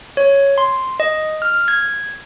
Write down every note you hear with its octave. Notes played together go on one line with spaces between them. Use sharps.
C#5
C6
D#5
F6
G#6